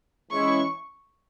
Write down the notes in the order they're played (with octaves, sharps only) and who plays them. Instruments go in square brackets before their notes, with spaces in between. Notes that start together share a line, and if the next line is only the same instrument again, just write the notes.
[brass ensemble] E3 G#3 C#4 E4 [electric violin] C#6